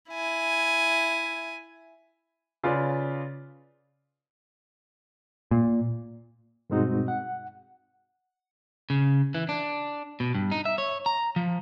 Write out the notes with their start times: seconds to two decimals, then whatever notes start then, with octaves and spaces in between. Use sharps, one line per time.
0.10 E4 G#5
2.64 C#3 F4 B4 D5
5.51 A#2
6.70 G2 B2 G#3 C4 D#4 F#4
7.08 F#5
8.90 C#3
9.35 E3
9.49 D4
10.20 B2
10.35 G2
10.51 D#4
10.65 E5
10.78 C#5
11.06 A#5
11.36 F3